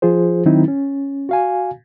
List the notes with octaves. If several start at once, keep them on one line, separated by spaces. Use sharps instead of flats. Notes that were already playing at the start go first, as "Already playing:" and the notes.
F3 F4 G#4 C5
D#3 F#3 C4 D#4 E4
C#4
F#4 F5 G#5